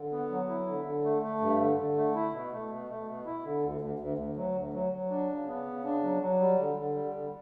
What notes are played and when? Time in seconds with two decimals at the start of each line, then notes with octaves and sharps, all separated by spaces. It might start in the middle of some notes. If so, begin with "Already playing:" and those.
Already playing: D3
0.12 B3
0.30 F#3
0.49 E4
0.67 D3
0.85 D3
1.04 A3
1.22 A3
1.41 G2
1.59 D3
1.78 D3
1.97 A3
2.15 E4
2.33 B2
2.52 A3
2.70 B2
2.89 A3
3.08 B2
3.26 E4
3.44 D3
3.63 D2
3.81 D2
3.99 D2
4.18 D2
4.37 F#3
4.55 D2
4.74 F#3
4.92 F#3
5.10 D4
5.29 C#3
5.48 B3
5.66 C#3
5.84 D4
6.03 F#3
6.21 F#3
6.40 G3
6.58 D3
6.76 D3
6.95 G3
7.14 D3